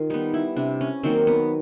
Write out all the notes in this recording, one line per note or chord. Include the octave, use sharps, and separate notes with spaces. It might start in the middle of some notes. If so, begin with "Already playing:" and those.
Already playing: D#3 F4
G3 B3 D#4
E4
C3 D4
C#4
D#3 F#3 A#3 C4
B3